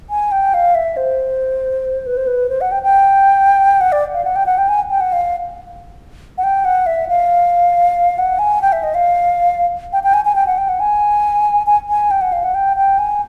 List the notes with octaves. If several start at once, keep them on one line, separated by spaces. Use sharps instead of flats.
G#5
G5
F5
E5
C5
B4
C5
B4
C5
F#5
G5
G5
F#5
D5
F5
F#5
G5
F#5
G5
G#5
G5
F#5
F5
F#5
G5
F#5
E5
F5
F#5
G#5
G5
E5
D#5
F5
G5
G5
G#5
G#5
G5
F#5
G5
F#5
G#5
G#5
G#5
G5
F#5
F5
F#5
G5
G5
G#5